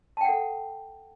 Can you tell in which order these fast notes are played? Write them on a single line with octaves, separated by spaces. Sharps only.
A5 G5 F#5 A4